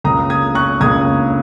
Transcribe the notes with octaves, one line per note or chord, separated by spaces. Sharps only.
C#2 C#3 A#3 A#5 D#6
D#6 G#6
C#6 F#6
C#2 C#3 A#3 D#6 G#6